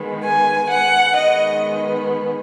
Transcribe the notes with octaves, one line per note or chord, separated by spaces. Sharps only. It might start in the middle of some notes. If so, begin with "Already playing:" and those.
Already playing: D#3 G#3 B3
G#5
F#5
D#3 G#3 B3 D#5